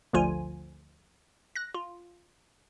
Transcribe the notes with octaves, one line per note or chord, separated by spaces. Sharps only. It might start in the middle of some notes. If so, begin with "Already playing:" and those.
G1 D2 D3 F3 F4 G#5
F#6 A#6
F4